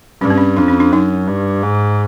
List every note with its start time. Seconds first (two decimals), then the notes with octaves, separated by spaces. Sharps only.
0.21 G2 C#4
0.30 C4
0.38 C#4
0.57 F2 D4
0.68 C#4
0.80 D4
0.92 F#2 D#4
1.27 G2
1.63 G#2